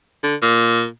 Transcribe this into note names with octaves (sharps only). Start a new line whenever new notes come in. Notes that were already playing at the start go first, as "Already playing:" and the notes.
D3
A#2